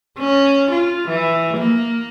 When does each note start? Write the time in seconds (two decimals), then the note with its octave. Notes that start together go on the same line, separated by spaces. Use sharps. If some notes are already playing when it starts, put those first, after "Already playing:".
0.19 C#4
0.71 F4
1.08 E3
1.58 A#3